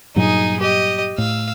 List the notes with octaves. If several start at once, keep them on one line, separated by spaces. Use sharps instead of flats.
G2 A#2 F#3 D#4 G#4
G4 D#5
A2 F5 E6